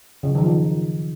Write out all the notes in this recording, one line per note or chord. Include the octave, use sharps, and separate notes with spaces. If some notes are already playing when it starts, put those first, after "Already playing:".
C#3
F#3
D#3
F3
D#3